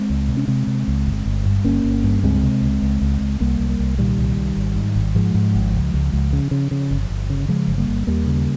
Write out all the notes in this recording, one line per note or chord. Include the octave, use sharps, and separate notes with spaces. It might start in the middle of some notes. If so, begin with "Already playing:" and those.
Already playing: G#3 C4
C#2
C3
C#4
C3 G#3 C4
C3
C#2
G1
G1
G2
G1 A#3 C#4
G1
G2
C#2 G#3 C4
C3
C#2
C#2
C#2
C#2
C2 G3 A#3
C2
G3 A#3
C2
A#2 D#3 G3
C2
C2
G#1
G#2
G#1
G#2 F3 G#3
G#2
G#1
C#2
C#2
C#2
C#3
C#3
C#3
G1
G1
C#3
C#3 F3 G#3
G1
G3 A#3
G1
D#2 G3 A#3
C#3